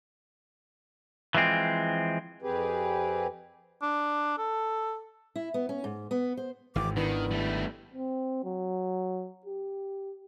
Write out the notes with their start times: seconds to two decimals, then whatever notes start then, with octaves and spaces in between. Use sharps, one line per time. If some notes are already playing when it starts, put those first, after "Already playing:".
1.35 E3 F3 G#3 C4
2.42 F2 C4 G4 G#4 B4
3.82 D4
4.38 A4
5.36 E4
5.54 B3
5.69 C#4
5.84 G#2
6.11 B3
6.37 C5
6.76 G#1 G#2 E3 G5 D6
6.96 D#3 B3 D4 E4 B4
7.31 G3 A3
7.94 C4
8.44 F#3
9.46 G4